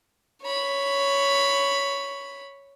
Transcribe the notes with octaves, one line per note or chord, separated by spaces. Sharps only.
C#5 B5